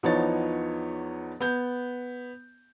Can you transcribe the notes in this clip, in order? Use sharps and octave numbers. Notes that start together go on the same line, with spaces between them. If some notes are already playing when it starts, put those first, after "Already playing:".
E2 F3 B3 D#4 C#5 A6
B3 G6